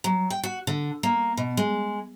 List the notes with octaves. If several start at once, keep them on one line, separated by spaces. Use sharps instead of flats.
F#3
G5
F#4
D3
A#3
B2
G#3